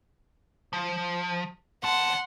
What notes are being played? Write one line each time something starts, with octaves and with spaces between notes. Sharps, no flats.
F3
E2 F#5 A5 C6